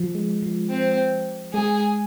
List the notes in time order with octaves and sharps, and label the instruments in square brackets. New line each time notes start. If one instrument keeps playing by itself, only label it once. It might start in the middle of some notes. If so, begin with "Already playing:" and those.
Already playing: [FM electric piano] F3
G#3
F3
[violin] C4
[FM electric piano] G#3 [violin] G#4